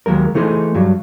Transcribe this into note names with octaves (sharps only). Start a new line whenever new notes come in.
D#2 F#3 G#3 A#4
E3 A3 D#4 G#4 C5
G2 F#3